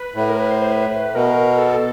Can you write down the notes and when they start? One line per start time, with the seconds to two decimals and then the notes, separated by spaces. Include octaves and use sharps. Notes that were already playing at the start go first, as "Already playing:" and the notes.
Already playing: B4
0.15 A2
0.29 A#4
0.40 B4
0.51 C5
0.62 C5
0.72 B4
1.15 B2 A#4
1.58 A4